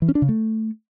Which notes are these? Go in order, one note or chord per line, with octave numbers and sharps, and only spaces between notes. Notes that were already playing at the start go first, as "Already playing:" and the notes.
E3
C#4
D4
C#3
A3